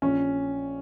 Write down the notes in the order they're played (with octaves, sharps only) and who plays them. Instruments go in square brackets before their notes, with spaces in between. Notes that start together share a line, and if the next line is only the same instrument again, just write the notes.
[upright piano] A#1 C#4